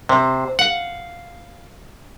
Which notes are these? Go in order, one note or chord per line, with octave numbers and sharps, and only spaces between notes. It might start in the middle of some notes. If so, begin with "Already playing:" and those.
C3 C5
F5 F#5